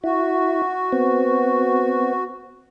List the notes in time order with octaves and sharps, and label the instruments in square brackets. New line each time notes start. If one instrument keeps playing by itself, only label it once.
[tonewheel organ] E4 [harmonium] F#4
[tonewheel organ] B3 C4